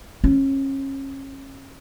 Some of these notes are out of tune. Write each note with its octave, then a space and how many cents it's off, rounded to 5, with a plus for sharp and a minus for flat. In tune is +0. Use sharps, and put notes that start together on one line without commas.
C#4 -30